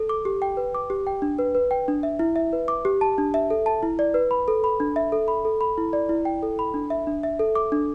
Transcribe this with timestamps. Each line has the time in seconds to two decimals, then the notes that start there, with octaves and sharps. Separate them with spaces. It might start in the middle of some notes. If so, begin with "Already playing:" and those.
Already playing: A4
0.09 D6
0.25 G4
0.42 G5
0.57 B4
0.75 D6
0.90 G4
1.07 G5
1.22 D4
1.38 B4
1.55 B4
1.71 G5
1.88 D4
2.03 E5
2.19 E4
2.36 E5
2.53 B4
2.68 D6
2.85 G4
3.01 A5
3.18 D4
3.34 E5
3.50 A4
3.66 A5
3.83 E4
3.99 D5
4.14 B4
4.31 B5
4.48 A4
4.64 B5
4.80 D4
4.96 E5
5.12 A4
5.28 B5
5.45 A4
5.61 B5
5.78 E4
5.93 D5
6.09 E4
6.25 G5
6.43 A4
6.59 B5
6.74 D4
6.90 E5
7.07 D4
7.23 E5
7.39 A4
7.55 D6
7.72 D4